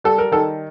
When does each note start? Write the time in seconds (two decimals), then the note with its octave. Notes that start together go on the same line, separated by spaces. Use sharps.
0.04 G3 A4
0.18 A#4
0.32 D#3 A4